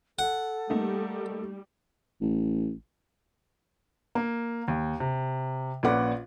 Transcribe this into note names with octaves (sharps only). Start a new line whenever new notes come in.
A4 F#5
G3 A3 A#3 D#4
A1
A#3
D#2
C3
A#1 A#2 C#4 B4 F#5 D6